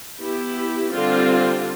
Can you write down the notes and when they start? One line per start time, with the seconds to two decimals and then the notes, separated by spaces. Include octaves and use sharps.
0.21 B3 E4 G4
0.93 D3 G3 C4 F4